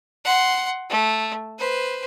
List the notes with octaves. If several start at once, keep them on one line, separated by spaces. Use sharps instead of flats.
F#5 C6
A3
B4 C5